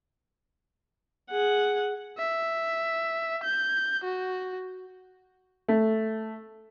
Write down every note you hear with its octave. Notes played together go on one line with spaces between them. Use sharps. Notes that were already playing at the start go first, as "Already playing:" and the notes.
G#4 F#5
E5
G6
F#4
A3